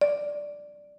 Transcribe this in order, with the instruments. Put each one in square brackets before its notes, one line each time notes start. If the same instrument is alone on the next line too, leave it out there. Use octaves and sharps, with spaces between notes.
[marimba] D5